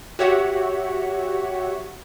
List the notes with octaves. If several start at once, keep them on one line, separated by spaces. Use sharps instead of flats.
F#4 G4 C#5 E5 F#5